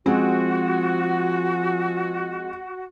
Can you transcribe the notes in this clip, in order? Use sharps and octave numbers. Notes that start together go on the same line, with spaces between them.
F3 G#3 C4 F#4